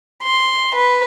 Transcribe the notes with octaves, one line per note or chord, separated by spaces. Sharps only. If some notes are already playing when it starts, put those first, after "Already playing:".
C6
B4